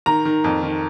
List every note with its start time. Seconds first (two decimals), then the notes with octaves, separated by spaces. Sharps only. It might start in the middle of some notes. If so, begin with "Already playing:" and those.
0.06 D#3 A#5
0.25 D#3
0.44 F2
0.63 D#3